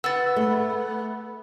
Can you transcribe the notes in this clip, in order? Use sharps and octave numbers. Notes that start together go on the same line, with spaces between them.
B3 E6 A6
A3